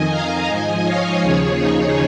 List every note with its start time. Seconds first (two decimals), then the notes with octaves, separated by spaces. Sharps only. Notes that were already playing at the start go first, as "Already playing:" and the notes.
Already playing: F2 D#3 D#5 G#5
0.11 F5 A#5
0.48 G#2 F3 D#5 G#5
0.85 C#5 F5
1.22 D#2 C#3 F3 G#4 C#5
1.59 D#4